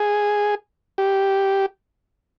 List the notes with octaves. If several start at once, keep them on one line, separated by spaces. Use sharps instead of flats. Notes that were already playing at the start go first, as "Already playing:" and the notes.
Already playing: G#4
G4